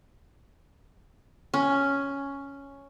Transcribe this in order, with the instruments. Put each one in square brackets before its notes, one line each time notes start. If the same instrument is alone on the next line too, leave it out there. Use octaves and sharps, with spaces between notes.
[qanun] C#4